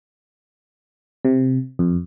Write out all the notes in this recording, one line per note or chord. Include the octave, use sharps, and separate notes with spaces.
C3
F2